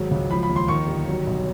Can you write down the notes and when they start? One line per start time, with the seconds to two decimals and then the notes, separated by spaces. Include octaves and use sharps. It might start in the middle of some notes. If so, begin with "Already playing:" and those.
Already playing: G#1 F#3
0.11 C#2
0.31 F3 B5
0.43 B5
0.49 D#2
0.56 C6
0.68 D#3 C#6
0.88 G1
1.08 F#3
1.27 B1